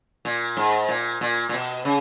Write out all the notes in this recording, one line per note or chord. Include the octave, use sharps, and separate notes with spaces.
A#2
G#2
A#2
A#2
A#2
B2
C#3